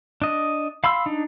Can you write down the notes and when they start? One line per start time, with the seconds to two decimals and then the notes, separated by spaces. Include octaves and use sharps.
0.22 D4 D#5
0.84 F5 B5 C6 E6
1.06 D4 D#4